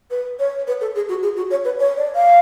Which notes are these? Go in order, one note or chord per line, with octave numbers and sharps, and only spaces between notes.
B4
C#5
B4
A4
G#4
F#4
G#4
F#4
C#5
B4
C#5
D5
F5